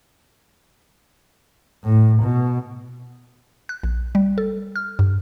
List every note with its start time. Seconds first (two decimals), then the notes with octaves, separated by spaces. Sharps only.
1.84 A2
2.23 B2
3.69 F#6
3.83 A#1
4.15 G3
4.38 A4
4.76 F6
4.99 G2